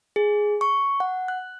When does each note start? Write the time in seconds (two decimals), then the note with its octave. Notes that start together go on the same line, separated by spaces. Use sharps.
0.16 G#4
0.61 C#6
1.00 F#5
1.28 F#6